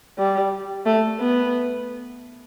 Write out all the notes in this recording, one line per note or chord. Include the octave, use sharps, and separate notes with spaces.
G3
A3
B3